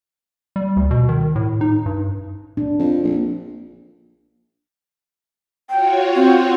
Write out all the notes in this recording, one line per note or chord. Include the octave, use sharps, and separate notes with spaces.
G3
D2
B2
D#3
A2
D#4
G2
D4
F2
A#1
F4 F#4 C#5 G5
C4